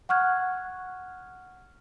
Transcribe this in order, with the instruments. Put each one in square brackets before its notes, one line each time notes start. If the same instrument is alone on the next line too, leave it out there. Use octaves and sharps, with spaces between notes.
[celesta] F#5 C#6 F6 F#6 G#6